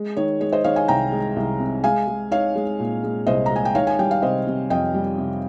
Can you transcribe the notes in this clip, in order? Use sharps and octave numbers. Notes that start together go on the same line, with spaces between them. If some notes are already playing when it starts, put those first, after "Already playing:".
Already playing: G#3
D#3 C#5
G#3 C#5
C5 D#5
D#3 C#5 F5
F5 G#5
C2 G5 A#5
G#3
C2
C3
G#3 F5 G#5
G#3
D#4 C#5 F5
G#3
A#2
G#3
C2 C5 D#5
A#5
G#3 G#5
G5
D#3 C#5 F5
G#5
G3 G5
F5
C3 C5 D#5
C3
F2 D#5 G5
G3
C3